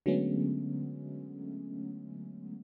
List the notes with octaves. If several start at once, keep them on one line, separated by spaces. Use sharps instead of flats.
D3 F#3 G#3 A3 B3 C#4